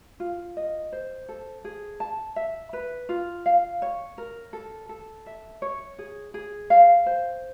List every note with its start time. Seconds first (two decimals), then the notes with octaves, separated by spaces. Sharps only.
0.20 F4
0.57 D#5
0.92 C5
1.29 A4
1.64 G#4
2.00 A5
2.36 E5
2.73 B4
3.09 F4
3.46 F5
3.82 C#5
4.18 A#4
4.53 A4
4.89 A4
5.26 E5
5.62 C#5
5.99 G#4
6.34 G#4
6.70 F5
7.06 C5